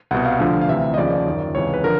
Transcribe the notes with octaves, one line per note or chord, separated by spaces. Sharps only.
C2 B2 F#5
F5
D2 D3 F3
F5
D2 C3 E3 E5
D#5
D#2 C#3 F3 D5
F#2 D#3
C#2 C3 E3 C#5
B4
D3 F3 A#4